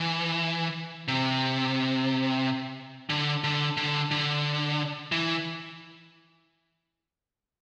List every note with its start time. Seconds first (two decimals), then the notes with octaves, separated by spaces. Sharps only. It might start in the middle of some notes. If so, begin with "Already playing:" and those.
Already playing: E3
1.08 C3
3.10 D3
3.44 D3
3.77 D3
4.11 D3
5.12 E3